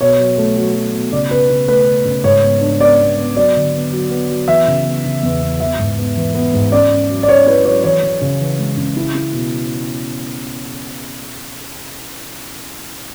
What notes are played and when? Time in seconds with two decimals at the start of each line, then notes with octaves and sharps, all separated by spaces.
0.01 B2 C#5
0.19 F#3
0.38 A3
0.57 F#3
0.74 F#3
0.94 B2
1.12 C#3 D5
1.31 C#3 B4
1.50 C#3
1.68 A3 B4
1.87 A3
2.05 C#3
2.24 G#2 C#5
2.43 B3
2.61 D4
2.80 B3 D5
2.99 B3
3.17 B3
3.36 F#3 D5
3.55 D3
3.74 B3
3.92 F#3
4.11 B3
4.30 F#3
4.48 E3 E5
4.67 C#3
4.85 B3
5.05 C#3
5.23 E2
5.42 B3
5.60 E3 E5
5.78 G#2
5.98 B3
6.17 E3
6.34 B3
6.54 G#2
6.72 C#4 D5
6.90 C#4
7.10 F#3
7.23 D5
7.28 C#4 C#5
7.46 E4 B4
7.65 F#3 C#5
7.84 E3 C#5
8.02 E3
8.21 C#3
8.40 E3
8.59 G#3
8.77 C#3
8.97 E4
9.15 E4
9.33 B2